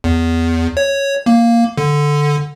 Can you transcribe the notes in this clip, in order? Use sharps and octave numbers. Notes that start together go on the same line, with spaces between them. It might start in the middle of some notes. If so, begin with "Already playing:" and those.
E2
C#5
A#3
D3